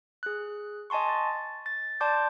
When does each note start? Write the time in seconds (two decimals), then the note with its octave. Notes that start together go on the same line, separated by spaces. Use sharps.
0.23 G#4 F#6
0.90 D#5 G#5 A5 C6 C#6
1.09 A6
1.66 A6
2.01 D5 A5 C6 D6 G6